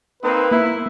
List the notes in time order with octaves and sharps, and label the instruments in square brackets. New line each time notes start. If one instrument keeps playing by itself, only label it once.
[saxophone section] A#3 C4 D#4 [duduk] B4
[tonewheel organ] A#3 [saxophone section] E4